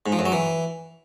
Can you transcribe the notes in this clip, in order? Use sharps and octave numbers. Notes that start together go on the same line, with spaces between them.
G#2
F3
F#2
F#3
E3